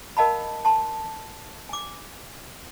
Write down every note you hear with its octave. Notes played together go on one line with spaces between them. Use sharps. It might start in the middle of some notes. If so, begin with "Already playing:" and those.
A#4 D#5 F5 A5 B5
A5 C6
G#5 D6